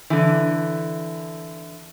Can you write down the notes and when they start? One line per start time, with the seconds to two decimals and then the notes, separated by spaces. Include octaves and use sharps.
0.10 D3 E3